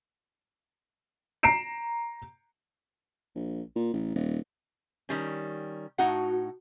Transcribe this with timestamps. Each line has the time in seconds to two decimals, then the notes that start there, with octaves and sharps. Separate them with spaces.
1.43 A#5 C7 D7 E7
3.35 A#1
3.76 A#2
3.94 A1
4.15 D#1
5.09 D#3 G3 C#4
5.98 A2 D#4 F#4 F#5